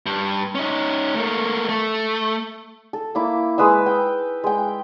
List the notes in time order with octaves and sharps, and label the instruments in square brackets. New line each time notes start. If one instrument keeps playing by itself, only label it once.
[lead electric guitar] G2
C#4 D#4
A3 A#3
A3
[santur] A4
A#3 E4 D6
G#3 B4 D#6 E6
G5
G#3 G5